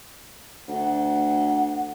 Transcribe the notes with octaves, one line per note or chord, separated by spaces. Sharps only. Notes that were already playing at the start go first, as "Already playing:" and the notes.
D2 F#5